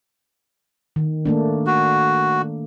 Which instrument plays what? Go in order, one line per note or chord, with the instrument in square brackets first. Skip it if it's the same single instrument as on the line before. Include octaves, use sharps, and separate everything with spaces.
[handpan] D#3
A3 A#3 D4
[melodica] F#4